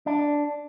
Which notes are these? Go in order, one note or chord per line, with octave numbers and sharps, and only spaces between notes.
D4